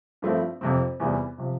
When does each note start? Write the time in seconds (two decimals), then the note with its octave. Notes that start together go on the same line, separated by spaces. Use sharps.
0.22 G2 F3 A3 C4 E4
0.61 F2 C3 F3 C4
1.00 E2 C3 E3 G3 B3
1.38 C3 F3